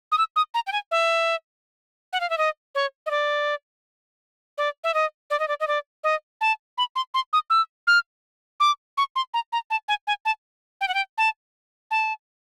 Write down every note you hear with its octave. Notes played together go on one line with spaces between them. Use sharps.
D#6
E6
D#6
A#5
G5
G#5
E5
F#5
F5
E5
D#5
C#5
D#5
D5
D5
E5
D#5
D5
D#5
D5
D#5
D5
D#5
A5
B5
C6
C6
D#6
E6
F6
D6
C#6
C6
A#5
A#5
A5
G#5
G#5
A5
G5
F#5
G5
A5
A5